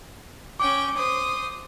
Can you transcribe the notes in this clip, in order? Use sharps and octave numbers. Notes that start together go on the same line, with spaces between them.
C#4 G5 D6
C5 D#6